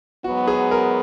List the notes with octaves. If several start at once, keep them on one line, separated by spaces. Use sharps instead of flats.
G#2 F#3 B3 F#4
G#4
A#4